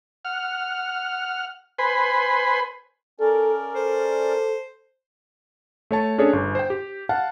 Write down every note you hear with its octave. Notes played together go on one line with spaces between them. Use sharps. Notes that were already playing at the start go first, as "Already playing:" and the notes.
F#5 F6
B4 C5 G#5 B5 C6
C#4 A4 A#4 D5
A4 C5
A3 C#5 A5
C#4 D4 G#4 A4 C#5
G1
C5 G5
G4
F5 F#5 A5